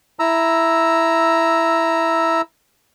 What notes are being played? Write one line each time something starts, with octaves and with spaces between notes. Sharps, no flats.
E4 A#5 E6